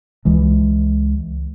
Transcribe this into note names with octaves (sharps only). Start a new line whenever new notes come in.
C#2 E3 G#3